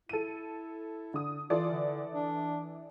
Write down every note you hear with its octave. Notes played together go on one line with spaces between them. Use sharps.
E4 A4 D#7
D3 D#6
E3 F4 A4 D5
D3
D4